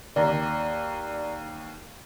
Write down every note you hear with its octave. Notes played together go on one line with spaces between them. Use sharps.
D#2 D5 A#5